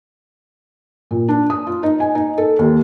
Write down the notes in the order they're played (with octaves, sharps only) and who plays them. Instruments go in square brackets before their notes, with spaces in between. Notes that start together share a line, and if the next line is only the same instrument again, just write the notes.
[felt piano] A#2
D4
D#6
F4
D#4
G#5
D#4
A4
D#2